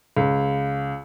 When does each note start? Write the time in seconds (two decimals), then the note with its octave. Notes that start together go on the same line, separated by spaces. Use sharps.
0.17 C#2